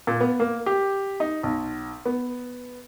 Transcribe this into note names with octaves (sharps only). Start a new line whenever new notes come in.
A#2
B3
A#3
G4
D#4
B1
B3